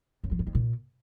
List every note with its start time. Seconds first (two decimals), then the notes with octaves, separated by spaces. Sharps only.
0.24 F#2
0.31 F3
0.39 F#2
0.47 F2
0.55 A#2